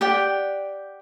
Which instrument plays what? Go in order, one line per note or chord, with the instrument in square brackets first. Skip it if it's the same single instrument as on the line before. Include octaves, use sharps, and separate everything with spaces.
[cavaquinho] G4 D5 F#5 G5